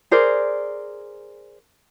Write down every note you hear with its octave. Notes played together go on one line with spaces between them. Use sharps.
G#4 A#4 C5 D5